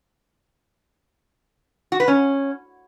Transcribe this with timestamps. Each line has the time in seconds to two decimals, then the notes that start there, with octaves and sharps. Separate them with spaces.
1.92 F#4
2.00 B4
2.08 C#4